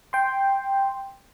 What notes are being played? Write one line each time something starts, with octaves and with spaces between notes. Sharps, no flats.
G5 C6